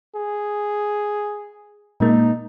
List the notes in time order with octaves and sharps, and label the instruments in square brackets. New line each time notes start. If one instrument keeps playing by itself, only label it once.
[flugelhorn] G#4
[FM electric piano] A#2 G#3 A#3 [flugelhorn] D#4